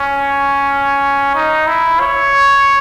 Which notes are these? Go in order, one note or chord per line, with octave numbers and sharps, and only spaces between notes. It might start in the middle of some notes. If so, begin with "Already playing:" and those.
Already playing: C#4
D#4
E4
C#5